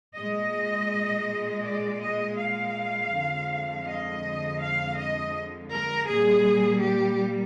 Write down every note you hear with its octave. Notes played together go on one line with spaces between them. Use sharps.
A#2 G#3 D#5
D5
D#5
F5
F2 D3 F3 G#3
D#5
F5
D#5
A#4
A#2 G3 A#3 G#4
G4